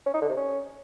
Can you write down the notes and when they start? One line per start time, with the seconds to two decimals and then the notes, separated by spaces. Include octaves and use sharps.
0.06 C#4
0.14 D#4
0.21 D3
0.29 C3
0.37 C#4